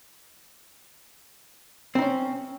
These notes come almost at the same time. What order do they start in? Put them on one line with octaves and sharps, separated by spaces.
C4 D#4 C#4